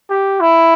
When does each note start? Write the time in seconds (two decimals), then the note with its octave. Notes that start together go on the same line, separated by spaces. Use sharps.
0.10 G4
0.41 E4